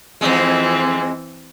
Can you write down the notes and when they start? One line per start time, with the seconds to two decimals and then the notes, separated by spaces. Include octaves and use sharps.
0.21 F2 E3 G#3 C4